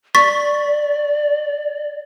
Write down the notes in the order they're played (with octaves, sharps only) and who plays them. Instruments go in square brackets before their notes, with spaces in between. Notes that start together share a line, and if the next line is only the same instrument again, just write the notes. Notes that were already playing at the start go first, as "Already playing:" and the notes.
[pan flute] D5 [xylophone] C#6 A6 B6